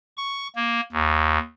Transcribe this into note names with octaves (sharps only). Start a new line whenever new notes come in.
C#6
A#3
D#2